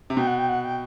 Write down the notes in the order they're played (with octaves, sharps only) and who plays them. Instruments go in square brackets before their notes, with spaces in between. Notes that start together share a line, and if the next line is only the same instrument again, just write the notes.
[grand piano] C3
[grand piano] B2 [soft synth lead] G5
[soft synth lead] F#5
G5
F#5
G5